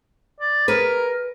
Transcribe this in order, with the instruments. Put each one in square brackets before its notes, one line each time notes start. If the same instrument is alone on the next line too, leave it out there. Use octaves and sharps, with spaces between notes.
[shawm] D5
[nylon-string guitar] G#4 B4 [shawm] A#4